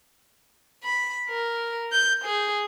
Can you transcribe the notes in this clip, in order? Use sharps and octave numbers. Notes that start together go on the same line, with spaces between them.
B5
A#4
G6
G#4